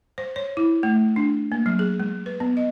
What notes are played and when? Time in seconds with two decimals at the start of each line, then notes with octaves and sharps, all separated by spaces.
0.18 C5
0.36 C#5
0.57 E4
0.83 A3
1.16 D4
1.52 A#3
1.66 F#3
1.79 G#4
2.00 G#3
2.26 B4
2.40 B3
2.57 D#5